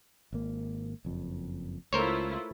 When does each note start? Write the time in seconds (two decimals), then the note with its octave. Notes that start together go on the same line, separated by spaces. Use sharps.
0.33 G#1 A#3
1.05 F#1 F2
1.93 C#2 A3 E4 F4 A#4 C5 C#5